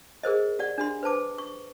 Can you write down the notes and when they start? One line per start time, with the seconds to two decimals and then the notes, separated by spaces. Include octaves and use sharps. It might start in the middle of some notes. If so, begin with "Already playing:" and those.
0.23 G#4 A#4 C5 D#5
0.59 G4 D5 F#5
0.78 D4 G4 C6
1.03 B4 C5 A5 D6
1.38 C#6